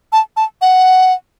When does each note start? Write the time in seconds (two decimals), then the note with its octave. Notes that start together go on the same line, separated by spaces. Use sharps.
0.12 A5
0.37 A5
0.61 F#5